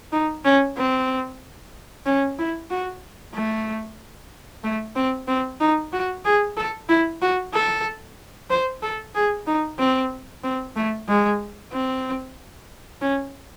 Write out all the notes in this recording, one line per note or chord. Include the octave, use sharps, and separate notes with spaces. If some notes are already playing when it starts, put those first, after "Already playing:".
D#4
C#4
C4
C#4
E4
F#4
A3
A3
C4
C4
D#4
F#4
G#4
A4
E4
F#4
A4
C5
A4
G#4
D#4
C4
C4
A3
G#3
C4
C#4